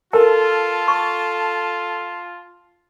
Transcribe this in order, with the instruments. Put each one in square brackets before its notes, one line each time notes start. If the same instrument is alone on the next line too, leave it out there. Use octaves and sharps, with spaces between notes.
[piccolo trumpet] F4 [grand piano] A4 [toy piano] A#4 [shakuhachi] A5
[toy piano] C#6